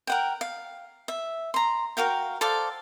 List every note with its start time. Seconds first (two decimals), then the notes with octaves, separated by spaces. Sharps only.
0.07 A#4 F#5 G5
0.41 F5
1.08 E5
1.54 A#5 C6
1.97 F#4 A#4 F5 G5
2.41 A4 C5 D5 F5